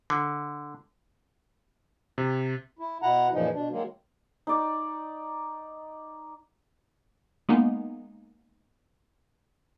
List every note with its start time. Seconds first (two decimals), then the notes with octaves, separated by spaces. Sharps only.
0.10 D3
2.18 C3
2.79 E4
3.02 B2 E4 F#5 A#5
3.33 F#2 A#2 C#3 E3 F3 D#4
3.54 B2 D4
3.71 D#3 F#3 G#3 A#3
4.47 D#4 D5
7.49 G#3 A#3 B3 D#4